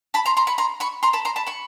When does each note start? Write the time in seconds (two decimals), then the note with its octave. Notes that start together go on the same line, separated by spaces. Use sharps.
0.14 A5 B5
0.26 A#5 C6
0.37 A#5 C6
0.47 B5 C#6
0.58 A#5 C6
0.80 B5 C#6
1.03 A#5 C6
1.13 A5 B5
1.25 A#5 C6
1.36 A5 B5
1.47 B5 C#6